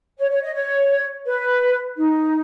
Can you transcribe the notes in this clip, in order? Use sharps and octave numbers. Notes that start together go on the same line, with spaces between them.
C#5
C#5
D#5
C#5
B4
D#4